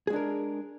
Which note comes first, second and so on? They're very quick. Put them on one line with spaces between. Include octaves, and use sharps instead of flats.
G#4 G#3 D4 A#4